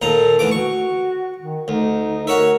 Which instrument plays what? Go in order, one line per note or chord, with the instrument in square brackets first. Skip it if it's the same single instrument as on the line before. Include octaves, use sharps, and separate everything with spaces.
[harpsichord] D#2 A#2 A#5 [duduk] A4
[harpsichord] D2 E3 D6
[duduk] F#4 [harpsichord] C#6
[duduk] D#3
[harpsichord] D2 [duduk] D#4
[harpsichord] F#4 C#5 E5 [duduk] A#4